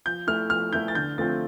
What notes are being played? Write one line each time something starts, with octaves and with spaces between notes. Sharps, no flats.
F3 G6
A3 E4 F6
F3 F6
A3 E4 G6
A6
D3 G6
F3 A3 C4 F4 A6